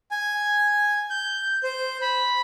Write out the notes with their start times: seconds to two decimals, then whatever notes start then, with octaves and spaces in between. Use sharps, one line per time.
0.11 G#5
1.10 G6
1.63 C5
2.02 B5